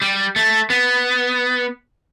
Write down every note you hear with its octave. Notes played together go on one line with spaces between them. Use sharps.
G3
A3
B3